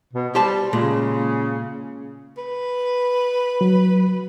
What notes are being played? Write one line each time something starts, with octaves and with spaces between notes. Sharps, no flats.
B2
G3 G4 C5 A5
A#2 C#3 G#3
B4
F#3